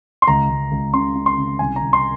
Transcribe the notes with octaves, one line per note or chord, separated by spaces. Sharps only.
C6
C#2 A#5
C#2
C#2
C#3 C6
C#3
C6
C#3
C2 G#5
A#5
C2
C6